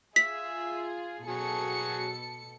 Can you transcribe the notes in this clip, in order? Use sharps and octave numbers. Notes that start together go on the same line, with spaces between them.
F4 G#4 E5 B6
B2 F#3 G#4 A4 C#7